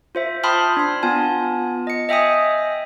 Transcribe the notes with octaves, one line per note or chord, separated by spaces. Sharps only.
F4 C5 E5
G5 A5 B5 C6 D#6 F6
D4 C6
B3 F4 G#5 A5
D#5 C#7
D#5 E5 G5 G#5 D#6